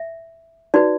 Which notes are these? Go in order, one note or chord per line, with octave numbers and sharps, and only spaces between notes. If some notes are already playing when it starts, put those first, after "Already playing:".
Already playing: E5
D#4 F#4 B4 D5